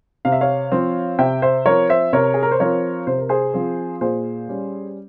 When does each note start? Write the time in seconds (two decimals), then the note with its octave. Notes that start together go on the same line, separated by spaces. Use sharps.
0.25 C3 F5
0.32 E5
0.41 C#5 F5
0.72 F3 C4
1.19 C3 E5 G5
1.42 C5 E5
1.66 F3 C4 A#4 C#5
1.89 C5 E5
2.13 C3 A#4 C#5
2.34 G#4
2.43 A#4
2.52 C5
2.60 F3 C4 A#4 C#5
3.07 C3 C5
3.18 A#4
3.29 G#4 C5
3.54 F3 C4
4.01 A#2 G#4 C5
4.49 G3 C#4